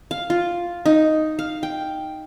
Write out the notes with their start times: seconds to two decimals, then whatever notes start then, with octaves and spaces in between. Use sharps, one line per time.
0.11 F5
0.30 F4
0.86 D#4
1.39 F5
1.63 G5